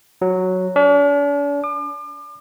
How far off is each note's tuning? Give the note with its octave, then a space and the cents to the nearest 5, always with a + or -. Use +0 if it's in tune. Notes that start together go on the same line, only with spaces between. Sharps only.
F#3 +0
D4 -45
D6 +40